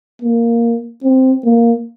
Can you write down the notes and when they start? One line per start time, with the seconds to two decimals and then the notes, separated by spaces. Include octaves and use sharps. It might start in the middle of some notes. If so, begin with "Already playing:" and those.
0.22 A#3
1.04 C4
1.44 A#3